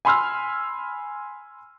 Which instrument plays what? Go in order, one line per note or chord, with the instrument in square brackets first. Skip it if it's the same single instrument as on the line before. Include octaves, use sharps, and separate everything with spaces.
[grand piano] G#5 B5 C6 E6 F6